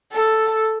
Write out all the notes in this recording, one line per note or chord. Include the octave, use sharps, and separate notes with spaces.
A4